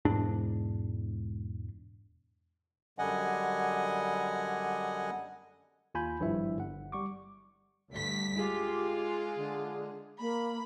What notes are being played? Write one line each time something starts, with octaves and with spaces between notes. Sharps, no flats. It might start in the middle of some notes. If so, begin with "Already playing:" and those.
E1 G#2 D4
F#2 D3 G3 D#5 F#5 G#5
D#2 F4 G#5 B5 G6
G#1 G2 F3 E4 E5
G1 F#5
G3 C#6 D6
D2 G2 B6
G#3 F4 G4
D3
A#3 B5